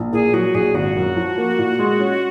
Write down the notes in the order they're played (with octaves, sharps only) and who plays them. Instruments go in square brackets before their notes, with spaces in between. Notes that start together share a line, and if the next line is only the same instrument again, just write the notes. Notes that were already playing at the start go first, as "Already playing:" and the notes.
Already playing: [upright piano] A#1
[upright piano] A#2 [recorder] G#4
[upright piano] F#3 [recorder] F#4
[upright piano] A#1 [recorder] G#4
[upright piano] G#1 [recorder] F#4
[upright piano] F#2
F3
A#3
A#2
G#3
C#4